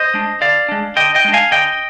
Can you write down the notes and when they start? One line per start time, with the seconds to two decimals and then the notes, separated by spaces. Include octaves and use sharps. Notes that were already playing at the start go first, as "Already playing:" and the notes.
Already playing: C5 D#5
0.14 G#3 D4
0.41 D3 D5 F5
0.69 G#3 D4
0.96 D3 D#5 G5
1.15 D#5 G5
1.25 G#3 D4
1.34 F5 G#5
1.51 D3 D#5 G5